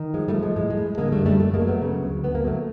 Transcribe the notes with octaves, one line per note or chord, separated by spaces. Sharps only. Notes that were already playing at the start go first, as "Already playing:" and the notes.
Already playing: D#3
F3 G#3
G3 A3
F3
G#3
A2 G#3
G#3
A2
D3 G#3 A#3
G3 A3
F#2
G3 A3
F#2 G3 A3
G#3 A#3
F#3
A3 B3
C#3
D2
D2 B3
A#3
F#3 A3